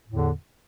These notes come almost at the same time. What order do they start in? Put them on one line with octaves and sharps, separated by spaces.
A2 E2 D3